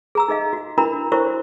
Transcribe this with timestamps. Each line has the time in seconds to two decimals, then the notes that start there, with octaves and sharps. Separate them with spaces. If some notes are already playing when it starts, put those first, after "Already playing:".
0.15 G#4 A#5 E6
0.28 D#4 G#4 D#5 F5
0.53 F#4
0.78 D4 E4 F#4 A#4 A#5 B5
1.12 E4 F#4 A#4 C5 C#5 C#6